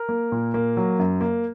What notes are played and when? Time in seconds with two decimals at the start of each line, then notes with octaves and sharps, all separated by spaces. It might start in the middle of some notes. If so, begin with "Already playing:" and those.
Already playing: A#4
0.09 A#3
0.32 A#2
0.54 A#3
0.77 F#3
0.99 F#2
1.21 A#3